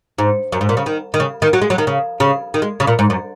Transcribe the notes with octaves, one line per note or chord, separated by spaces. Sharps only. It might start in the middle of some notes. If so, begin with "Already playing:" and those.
G#2
F#2
G#2
A#2
C#3
D#3
D#3
C#3
D#3
F#3
G#3
F#3
D#3
C#3
C#3
D#3
G#3
C#3
A#2
G#2
F#2